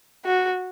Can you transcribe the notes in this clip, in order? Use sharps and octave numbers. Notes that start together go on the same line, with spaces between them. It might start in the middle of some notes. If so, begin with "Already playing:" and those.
F#4